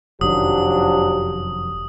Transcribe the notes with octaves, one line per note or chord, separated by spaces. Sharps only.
F1 F#2 D#3 F3 F#3 D4 G4 D#6